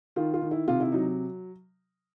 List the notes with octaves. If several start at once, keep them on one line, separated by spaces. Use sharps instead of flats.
D#3 F4
F4
D#3
E4
C3 F4
E4
F#3 D#4